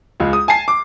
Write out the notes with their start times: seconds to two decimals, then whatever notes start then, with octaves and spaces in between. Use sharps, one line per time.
0.20 C#2 G#3 F4
0.33 D#6
0.48 G#5 A5 C7
0.68 D6